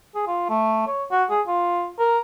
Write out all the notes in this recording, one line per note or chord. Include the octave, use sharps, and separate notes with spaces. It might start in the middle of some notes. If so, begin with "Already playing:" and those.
G#4
F4
A3
C#5
F#4
G#4
F4
A#4